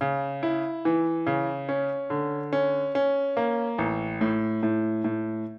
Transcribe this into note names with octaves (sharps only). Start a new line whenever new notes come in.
C#3
E4
E3
C#3
C#4
D3
C#4
C#4
A#3
A1
A2
A2
A2